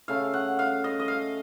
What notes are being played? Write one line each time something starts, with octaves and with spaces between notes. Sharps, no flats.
C#3 A3 F5
F#5
F5
D#5
D#5
F5